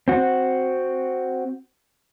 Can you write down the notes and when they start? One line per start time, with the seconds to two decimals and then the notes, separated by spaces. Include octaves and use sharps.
0.08 C4 F#4